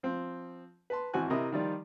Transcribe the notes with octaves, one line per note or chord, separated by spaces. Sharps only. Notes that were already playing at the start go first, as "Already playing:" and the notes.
F3 C4
B4 A5 C6
G#1 E3 C4 F#4 G#5 F#6
C3 E4 A#4 D#5 A#5 D#6
D#3 F3 G3 D#4 F4 D5